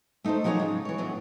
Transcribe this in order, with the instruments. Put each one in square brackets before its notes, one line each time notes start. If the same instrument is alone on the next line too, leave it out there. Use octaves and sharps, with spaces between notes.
[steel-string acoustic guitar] A3 D#4 E4 A4 C5
F3 F#3 D#4 G#4 C#5 D5
G#2 C#3
E3 C#5
E2 A2 F#3 D4